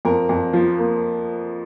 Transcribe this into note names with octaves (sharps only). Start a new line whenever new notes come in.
F2 A#4
F2
F3
A#3